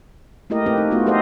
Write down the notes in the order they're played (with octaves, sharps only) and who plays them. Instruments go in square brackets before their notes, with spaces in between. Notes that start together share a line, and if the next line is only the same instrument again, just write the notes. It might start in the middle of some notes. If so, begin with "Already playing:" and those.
[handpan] A3 A#3 E4 G4 A#4 D#5
A3 A#3 C4 E4 G4 B4
D#4
A3 B3 F4 F#4
F#4 G4 A4 C5 D#5 F5